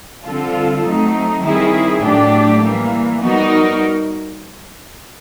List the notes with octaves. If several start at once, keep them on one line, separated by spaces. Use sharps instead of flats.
D3 G3 C4 F4 A4
F#3 A3 C4 D#4
D#3 G3 C4 E4 G#4
A2 F#3 A3 D4 G4
E3 G3 A#3
G3 B3 D#4 F#4 A#4